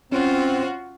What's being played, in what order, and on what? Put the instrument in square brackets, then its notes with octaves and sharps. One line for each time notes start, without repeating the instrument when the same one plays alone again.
[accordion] C4 [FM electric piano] C#4 [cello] F4 F#4